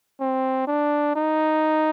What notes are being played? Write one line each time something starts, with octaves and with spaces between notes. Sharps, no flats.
C4
D4
D#4